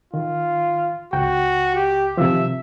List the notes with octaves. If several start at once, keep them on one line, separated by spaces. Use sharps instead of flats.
D#3 F4
C#2 F#4 G5
G4
C3 D#3 F3 E5